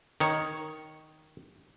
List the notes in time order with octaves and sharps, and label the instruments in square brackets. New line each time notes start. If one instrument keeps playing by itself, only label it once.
[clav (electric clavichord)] D#3 C#5